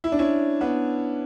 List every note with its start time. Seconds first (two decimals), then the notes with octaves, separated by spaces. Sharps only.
0.04 E4
0.12 D4
0.19 C#4 E4
0.61 B3 D4